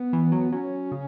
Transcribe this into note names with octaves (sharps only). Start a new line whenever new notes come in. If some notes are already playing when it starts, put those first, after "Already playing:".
Already playing: B3
E3
F#3
F#3 C#4
C#3